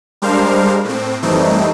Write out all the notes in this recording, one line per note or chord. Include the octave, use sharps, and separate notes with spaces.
G3 G#3 D4 A#4 C5 F5
A2 C4
F#2 E3 G3 A3 C4 D#4